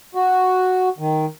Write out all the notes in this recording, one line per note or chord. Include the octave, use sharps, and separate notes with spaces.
F#4
D#3